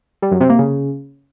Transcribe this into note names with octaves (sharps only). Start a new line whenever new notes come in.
G3
F#2
C3
A#3
C#3